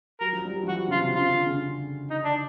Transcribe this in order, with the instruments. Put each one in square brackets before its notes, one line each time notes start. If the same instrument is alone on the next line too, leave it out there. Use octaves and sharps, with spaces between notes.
[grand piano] F#3 [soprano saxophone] A#4
[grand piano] F3
G3
F#3
F3
[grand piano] E3 [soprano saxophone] F#4
[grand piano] C#3 [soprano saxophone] F4
[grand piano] C3
[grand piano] C#3 [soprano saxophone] F4
[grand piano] D3
C#3
[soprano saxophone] D#4
D4